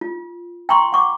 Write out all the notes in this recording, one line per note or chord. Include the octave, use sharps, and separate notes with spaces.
F4
G5 A#5 C6 C#6
F#5 C#6 D6